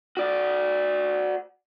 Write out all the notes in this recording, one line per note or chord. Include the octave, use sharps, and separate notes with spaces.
F#4 D5